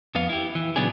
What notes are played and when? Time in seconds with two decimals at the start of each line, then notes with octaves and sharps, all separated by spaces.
0.15 F2 B3 F5
0.29 E4 G4
0.55 E3
0.76 A#2 C#3 F#3 B3 D4 G#4